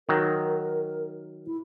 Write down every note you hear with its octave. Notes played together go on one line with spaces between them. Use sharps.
D#3 F#3 A#4
E4